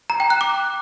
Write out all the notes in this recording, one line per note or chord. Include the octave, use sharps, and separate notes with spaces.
A#5
G5
F#6
D6